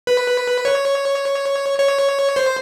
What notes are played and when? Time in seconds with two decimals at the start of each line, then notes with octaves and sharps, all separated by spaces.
0.07 B4
0.65 C#5
1.78 C#5
2.36 C5